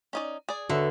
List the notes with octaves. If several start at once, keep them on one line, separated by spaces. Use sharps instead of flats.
C#4 D#4 D5
G#4 D5
D3 F#4 A4 B4 C#5 E5